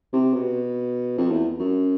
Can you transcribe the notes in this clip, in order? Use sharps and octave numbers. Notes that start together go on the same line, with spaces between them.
C3
B2
F2
E2
F#2